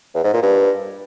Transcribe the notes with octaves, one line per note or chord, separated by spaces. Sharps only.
E2
G#2
A#2
G2